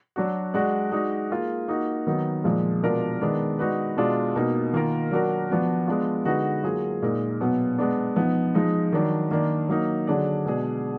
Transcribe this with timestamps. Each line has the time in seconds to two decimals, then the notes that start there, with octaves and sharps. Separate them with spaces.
0.16 F#3 D4 F#4
0.54 G#3 D4 F#4 D5
0.92 G#3 D#4 F#4 D5
1.31 A#3 F4 G#4
1.68 A#3 D#4 F#4
2.07 D#3 F#3 B3 D#4
2.44 A#2 F3 G#3
2.83 B2 G#3 D4 F4 A#4
3.21 D#3 G#3 B3 D4
3.59 G#3 D#4 F#4 B4 D5
3.97 B2 G#3 D4 F4
4.36 B2 A#3 D#4
4.73 D#3 A#3 F4 A#4
5.11 F#3 D4 F#4 A#4
5.50 F3 B3 D4 F#4
5.88 G#3 B3 D4 F4
6.25 D3 G#3 D#4 F#4 B4
6.63 F#3 A#3 F4 G#4
7.03 A#2 G#3 D#4 A#4
7.41 B2 F#3 B3
7.78 G#3 B3 D4
8.16 F3 B3 D#4
8.55 F3 G#3 D#4
8.92 D#3 F#3 D4
9.31 D#3 A#3 D4
9.69 F#3 A#3 D#4
10.07 D3 F#3 D4 G#4 D5
10.46 B2 G#3 D4 G#4 D5